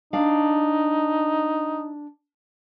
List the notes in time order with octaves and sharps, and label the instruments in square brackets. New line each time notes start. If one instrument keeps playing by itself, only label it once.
[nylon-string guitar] D4 F5 [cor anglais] D#4